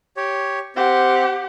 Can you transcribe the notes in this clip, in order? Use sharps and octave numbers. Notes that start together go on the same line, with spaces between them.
G4 C#5
C4 G4 F#5